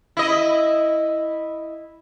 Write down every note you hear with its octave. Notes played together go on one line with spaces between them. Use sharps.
E4 D#5